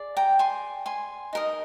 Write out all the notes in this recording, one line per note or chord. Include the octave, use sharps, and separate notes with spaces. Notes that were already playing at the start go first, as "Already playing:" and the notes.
Already playing: G#4 D5
G5 A#5
G#5 C6
G#5 C6
D#4 A#4 D#5